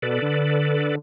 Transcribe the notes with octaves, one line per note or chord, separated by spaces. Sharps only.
B2 A4 B4 D5
D3